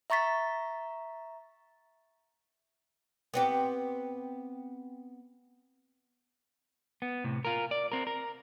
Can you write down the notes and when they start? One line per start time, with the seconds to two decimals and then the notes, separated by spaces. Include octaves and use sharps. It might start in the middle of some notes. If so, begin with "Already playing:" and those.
0.10 E5 A#5 C#6 A6 B6
3.34 B3 C4 G4
7.02 B3
7.24 A2 C3
7.45 F4 A#4
7.71 D5
7.92 C4 A#4
8.07 A#4